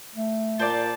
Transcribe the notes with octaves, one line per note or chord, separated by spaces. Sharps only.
A3
A#2 C5 D5 A5